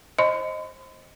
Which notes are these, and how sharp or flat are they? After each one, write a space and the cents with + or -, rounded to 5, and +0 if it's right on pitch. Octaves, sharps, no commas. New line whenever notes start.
C5 +20 D#5 +0 B5 +45